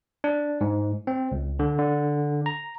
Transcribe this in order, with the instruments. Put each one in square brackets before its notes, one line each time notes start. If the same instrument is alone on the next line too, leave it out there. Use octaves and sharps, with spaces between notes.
[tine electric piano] D4
G#2
C4
C#2
D3
D3
A#5